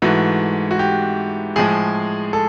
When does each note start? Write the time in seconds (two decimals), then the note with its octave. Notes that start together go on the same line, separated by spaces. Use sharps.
0.02 G#2 E3 A3 F#4
0.71 F#4
0.79 G4
1.56 A2 F3 G#3 G#4
2.33 A4